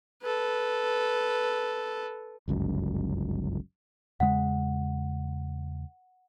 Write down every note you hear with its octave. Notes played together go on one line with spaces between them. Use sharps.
A4 B4
G1 C#2 F#2
E2 C#3 G#3 F#5